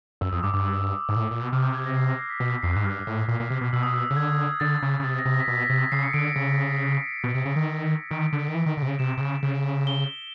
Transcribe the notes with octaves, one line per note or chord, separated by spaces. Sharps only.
F#2 E6
F2 D#6
G2 D6
G2 D6
E6
G#2
A#2
A2
A#2
B2
C3 F6
G6
G#6
A#6
C7
A#6
C7
B6
B2 B6
A#6
F2 C7
G#2 F#6
G2 F6
A2
A#2
A#2
C3
B2
B2 E6
D#6
E6
C#3
D3 G#6
D3 A6
C#3
C#3
C3 A6
A#6
C3
A#6
B6
B2 A#6
B6
A#6
C3
C#3 C7
C#7
D3 D7
C#7
C#3 C#7
B2 C7
C3
C#3
D#3
D#3 D7
D3
D#3
E3
D#3
D3
C3
C#3
C3 E7
C3
C#3
C#3
G7